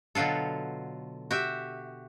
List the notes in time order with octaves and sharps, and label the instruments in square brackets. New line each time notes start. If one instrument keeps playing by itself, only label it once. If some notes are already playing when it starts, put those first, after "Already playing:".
[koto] B2 D3 F#3 F4 A4
F#4 G4 E5